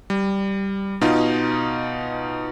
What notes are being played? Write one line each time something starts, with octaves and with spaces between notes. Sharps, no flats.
G3
B2 D#4 F4